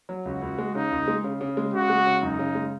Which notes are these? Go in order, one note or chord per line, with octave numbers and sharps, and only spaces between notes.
F#3
C#2 F#4
C#2
G#3
C#3 D#4
C#2
G#3
C#3
C#3
G#3
C#3 F#4
G#3
C#3
F#2 D#4
C#3
G#3